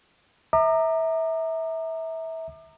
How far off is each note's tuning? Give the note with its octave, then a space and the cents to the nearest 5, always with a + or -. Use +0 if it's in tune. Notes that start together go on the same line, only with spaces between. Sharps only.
E5 -25 A#5 -15 D6 +40